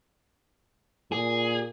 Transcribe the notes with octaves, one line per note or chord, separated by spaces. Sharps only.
A#2 G#4